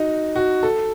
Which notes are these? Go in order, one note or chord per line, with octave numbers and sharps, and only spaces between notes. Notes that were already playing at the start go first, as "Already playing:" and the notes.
Already playing: D#4 F#4
F#4
A4